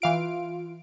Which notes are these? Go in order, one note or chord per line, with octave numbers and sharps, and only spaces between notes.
E3 F4 F5 D7